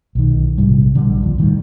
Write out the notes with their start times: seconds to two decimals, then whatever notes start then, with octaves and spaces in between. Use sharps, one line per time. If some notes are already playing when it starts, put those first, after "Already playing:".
0.15 B1 D#3
0.58 A#1 G#2 C3 G3
0.95 A#1 D3 F#3 G3
1.22 D#2 F3
1.38 A2 D#3 G3